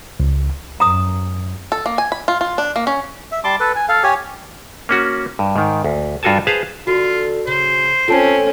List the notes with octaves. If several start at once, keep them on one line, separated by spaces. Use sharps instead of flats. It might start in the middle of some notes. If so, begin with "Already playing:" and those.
C#2
F#2 A#5 D#6
A4
A#3
G#5
B5
F4
F4
D4
A#3
C#4
E5
G3 A5 C6 D6
A4 B4
G#5
A4 F5
G4 C#5 G#5
A#3 C#4 F#4
G2
G#2 D#3
D2
G2 F4 F#4 A4 G#5 A5
G#4 B4 C5 F5 A5
D3 F4 F#4
C#3 C5
A3 C4 C#4 F4 A5 C7